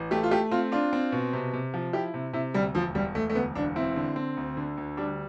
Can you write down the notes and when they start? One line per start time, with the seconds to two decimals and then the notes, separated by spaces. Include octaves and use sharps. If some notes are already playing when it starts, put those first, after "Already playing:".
Already playing: A1
0.11 A3 G4
0.23 F4
0.31 A3 G4
0.51 C4 F4
0.72 D4 F4
0.93 C4
1.12 B2
1.33 C3
1.53 C3
1.74 F3
1.93 E4 G4
2.14 C3
2.33 C3 E4
2.54 D2 G3
2.75 E1 F3
2.95 E1 G3
3.15 E1 A3
3.30 A3
3.35 D2 B3
3.55 E1 D4
3.76 C4 E4
3.96 D3
4.16 C4
4.37 D2
4.57 D3
4.77 D2
4.97 G3 D4